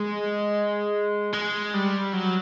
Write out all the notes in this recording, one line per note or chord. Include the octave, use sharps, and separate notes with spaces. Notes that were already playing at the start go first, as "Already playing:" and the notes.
Already playing: G#3
G#3
G3
F#3